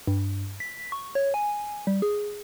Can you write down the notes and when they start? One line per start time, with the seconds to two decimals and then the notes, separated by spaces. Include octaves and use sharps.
0.07 G2
0.60 B6
0.92 C#6
1.15 C#5
1.34 G#5
1.87 G3
2.02 G#4